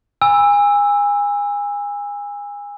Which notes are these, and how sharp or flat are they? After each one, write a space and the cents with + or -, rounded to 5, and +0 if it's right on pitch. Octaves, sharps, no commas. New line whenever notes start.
G#5 -25 B5 +0 E6 +0